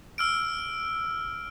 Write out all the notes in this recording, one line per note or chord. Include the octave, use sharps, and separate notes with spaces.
E6 F6 D7